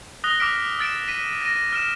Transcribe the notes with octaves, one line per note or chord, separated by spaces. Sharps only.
D#6 F#6 A#6 G7
D6 D#6 F6 B6 D7 G7
E6 A6 D7 E7
B6 D#7
A#6 D#7
F6 D7 E7